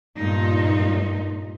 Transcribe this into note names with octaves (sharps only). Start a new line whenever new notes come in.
G2 A#2 D#4